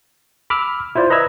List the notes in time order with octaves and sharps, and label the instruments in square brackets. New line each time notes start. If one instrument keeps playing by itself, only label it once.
[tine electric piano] B5 D6 E6 F6
E4 F4 C5 D5
B4 D#5 A#5 B5 E6 G#6